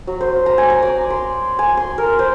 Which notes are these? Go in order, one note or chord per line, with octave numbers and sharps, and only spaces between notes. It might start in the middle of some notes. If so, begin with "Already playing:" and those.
F#3
C5
A#5
G#5
A#5
D5
C6
G#5
C6
A#4
C5